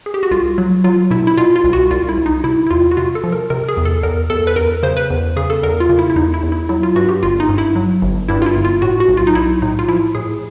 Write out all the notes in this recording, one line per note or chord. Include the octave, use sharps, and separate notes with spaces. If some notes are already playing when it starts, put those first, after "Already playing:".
G#4
G4
F#4
C2 F4
F#3
F#3 F4
B2 E4
E4
B2 F4
F4
C2
F#4
C2 F4
E4
C2
D#4
C3 E4
E4
E2 F4
F#4
C3 F4
A4
F3
A#4
C3 A#4
G#4
E2
A4
E2 A#4
E2 A4
B4
E2 A#4
C#3 C5
B4
E2
C#3 G#4
A4
E2 A#4
F4
C#3
E4
E4
E2 D#4
E4
E2
E4
F#3 E4
F4
G2 F#4
G4
G1 F4
D#4
G2
E4
F#3
G1
G2 E4
F4
E4
G1
F4
A2 F#4
F#4
B1
F4
D#4
B1 E4
A2 D#4
F4
F3 E4
A2 G#4